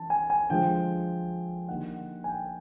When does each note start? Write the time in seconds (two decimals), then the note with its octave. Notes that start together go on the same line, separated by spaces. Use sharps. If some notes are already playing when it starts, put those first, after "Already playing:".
Already playing: E3 C#4 A5
0.10 G#5
0.30 G#5
0.50 D3 F3 G#3 G5
1.69 D3 G3 A#3 D#4 F#5
2.24 G#5
2.29 G5